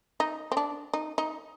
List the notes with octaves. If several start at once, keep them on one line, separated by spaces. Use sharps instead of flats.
D#4
C4
D4
D#4
D#4